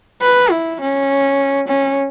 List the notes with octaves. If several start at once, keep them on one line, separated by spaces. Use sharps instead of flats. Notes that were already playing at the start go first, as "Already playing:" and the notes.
B4
E4
C#4
C#4